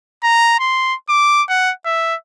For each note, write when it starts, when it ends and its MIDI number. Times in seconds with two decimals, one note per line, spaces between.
0.23 0.55 82
0.60 0.95 84
1.09 1.43 86
1.49 1.72 78
1.85 2.15 76